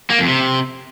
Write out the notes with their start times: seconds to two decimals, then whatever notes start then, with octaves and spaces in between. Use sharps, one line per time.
0.10 A#3
0.19 F2
0.28 C3